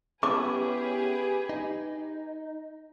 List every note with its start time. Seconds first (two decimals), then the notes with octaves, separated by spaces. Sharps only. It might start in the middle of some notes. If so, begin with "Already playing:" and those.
0.23 B3 C#4 E4 G4 G#4 B4 D6
1.49 D#4